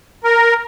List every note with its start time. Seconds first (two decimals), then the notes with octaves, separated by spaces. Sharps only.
0.24 A#4